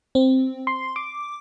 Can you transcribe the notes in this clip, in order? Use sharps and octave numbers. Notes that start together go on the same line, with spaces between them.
C4
C6
D6